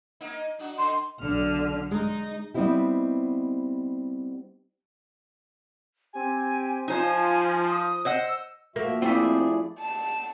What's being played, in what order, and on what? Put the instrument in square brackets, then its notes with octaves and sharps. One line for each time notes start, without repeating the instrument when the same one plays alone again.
[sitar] A#3 D#4
D4 D#4 F#4
[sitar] D3 D#4 [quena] C6
[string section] B1 D3 F6
[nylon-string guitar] G#3 [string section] D#4
[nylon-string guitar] G3 B3 C4 D#4 E4 G4
[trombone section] C4 G4 [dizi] G#5
[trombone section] F3 [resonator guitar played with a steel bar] D#4 C5 [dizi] G#5
[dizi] D#6
[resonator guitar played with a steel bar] C5 D#5 F#5 [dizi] E6
[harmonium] F3 F#4 E5 [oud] A#3
[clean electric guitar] A2 F3 G5 [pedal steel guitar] C4 E5 [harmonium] E4 G#4 D5
[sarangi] A5